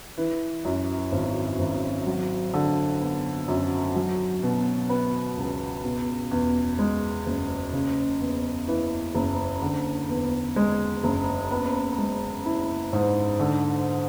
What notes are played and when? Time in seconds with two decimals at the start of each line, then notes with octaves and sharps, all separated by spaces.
0.18 E3
0.65 F#2
1.12 G#1
1.59 G#1
2.07 F#3
2.53 D3
3.01 B3
3.48 F#2
3.96 F#3
4.43 B2
4.89 B3
5.37 C#2
5.84 B2
6.31 E2
6.79 G#3
7.26 F#1
7.73 C#3
8.20 E2
8.68 E3
9.15 F#1
9.62 D3
10.09 E2
10.56 G#3
11.04 F#1
11.51 B3
11.98 G#3
12.46 E4
12.93 G#2
13.40 D3